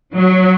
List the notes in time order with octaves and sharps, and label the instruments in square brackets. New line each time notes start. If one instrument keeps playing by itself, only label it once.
[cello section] F#3